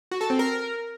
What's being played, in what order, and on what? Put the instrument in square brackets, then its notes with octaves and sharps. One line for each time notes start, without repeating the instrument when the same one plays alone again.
[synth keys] F#4
A4
C4
A#4